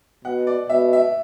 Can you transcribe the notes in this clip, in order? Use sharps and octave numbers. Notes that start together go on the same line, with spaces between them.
B2 F#5
D5
B2 E5
E5